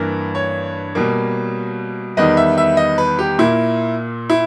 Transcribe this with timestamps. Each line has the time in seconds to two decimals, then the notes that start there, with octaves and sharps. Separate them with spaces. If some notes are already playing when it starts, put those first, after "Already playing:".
Already playing: G2 E3 A#3 A#4
0.35 C#5
0.95 B2 G3 A#3
2.17 E2 D#3 G3 B3 D#5
2.37 E5
2.57 E5
2.77 D#5
2.98 B4
3.19 G4
3.39 A#2 A#3 E4
4.30 E4